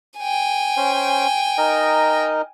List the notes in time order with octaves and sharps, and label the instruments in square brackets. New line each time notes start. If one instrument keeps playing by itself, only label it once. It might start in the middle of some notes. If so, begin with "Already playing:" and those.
[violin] G5 G#5
[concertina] C#4 C5
D#4 A#4 D#5